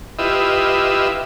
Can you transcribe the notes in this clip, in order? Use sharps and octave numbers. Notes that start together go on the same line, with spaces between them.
E4 F4 G4 B4 D#5 E5